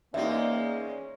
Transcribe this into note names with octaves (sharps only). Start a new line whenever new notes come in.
E2 G#3 A#3 C#4 D#4 E5